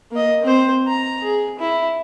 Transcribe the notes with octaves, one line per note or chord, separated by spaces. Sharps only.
A#3 D#5
C4 C5
A#5
G#4
E4